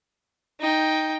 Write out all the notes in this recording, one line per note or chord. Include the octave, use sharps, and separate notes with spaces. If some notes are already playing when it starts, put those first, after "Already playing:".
D#4 G5